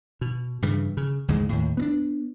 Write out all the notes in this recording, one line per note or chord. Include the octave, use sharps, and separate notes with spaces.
B2
G2 C#3 E3
C#3
D2 G#2 C#3 G#3
D#2 A2
B3 C4 D4